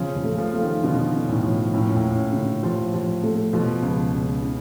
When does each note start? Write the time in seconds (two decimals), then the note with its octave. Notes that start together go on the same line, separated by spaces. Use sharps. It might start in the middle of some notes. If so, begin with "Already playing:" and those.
Already playing: C#3 F3
0.16 C#3
0.24 A3
0.38 F3
0.54 A3
0.61 D#3
0.84 B2 D3
1.14 C#4
1.29 A2
1.44 F3
1.73 A2 C#4
1.85 A#2
1.96 A2
2.03 C#4
2.33 D3
2.63 F3
2.93 F3
3.23 A3
3.53 B2 F3
3.82 C#2
4.13 C#2
4.43 C#3